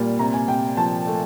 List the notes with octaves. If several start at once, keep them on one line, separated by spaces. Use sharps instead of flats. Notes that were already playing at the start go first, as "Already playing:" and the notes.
Already playing: A#2 G3
C3 A#5
G#5
C3 G5
F3 A5
A3